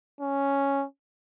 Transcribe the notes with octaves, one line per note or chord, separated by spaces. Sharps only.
C#4